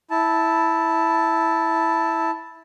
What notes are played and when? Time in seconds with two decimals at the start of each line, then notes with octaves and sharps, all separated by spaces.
0.11 E4 A5